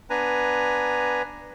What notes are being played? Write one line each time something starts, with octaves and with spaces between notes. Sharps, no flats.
B3 D4 B4 G#5 A#5